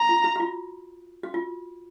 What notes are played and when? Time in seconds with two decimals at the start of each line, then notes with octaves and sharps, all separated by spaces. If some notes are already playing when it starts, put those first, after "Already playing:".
Already playing: A#5
0.09 F4
0.24 F#4
0.36 F#4
0.40 F4
1.23 F#4
1.34 F4